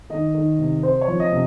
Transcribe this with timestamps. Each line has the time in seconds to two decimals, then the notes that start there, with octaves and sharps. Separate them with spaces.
0.10 D#3 D#5
0.34 D#3
0.59 C3
0.83 C4 C5
1.01 C#5
1.07 F3
1.20 D#5
1.32 C3